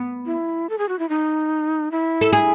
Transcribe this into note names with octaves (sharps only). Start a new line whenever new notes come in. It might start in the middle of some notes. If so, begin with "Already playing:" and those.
Already playing: B3
E4
A4
G#4
F#4
E4
D#4
E4
A4
G#4